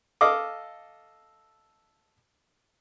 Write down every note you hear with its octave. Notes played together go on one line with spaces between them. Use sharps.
A4 D#5 F5 D6